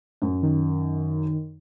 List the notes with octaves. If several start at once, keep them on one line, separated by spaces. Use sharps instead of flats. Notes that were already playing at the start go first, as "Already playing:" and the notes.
F#2
D#3